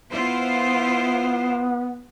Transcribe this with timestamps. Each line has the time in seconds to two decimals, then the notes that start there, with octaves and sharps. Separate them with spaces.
0.10 B3 E4 F4 C5